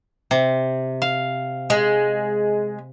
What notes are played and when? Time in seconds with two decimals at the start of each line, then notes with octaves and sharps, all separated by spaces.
0.31 C3
1.02 F5
1.70 G#3